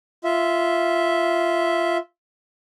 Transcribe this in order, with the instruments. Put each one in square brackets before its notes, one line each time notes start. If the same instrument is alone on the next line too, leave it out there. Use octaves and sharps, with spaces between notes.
[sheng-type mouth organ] F4 E5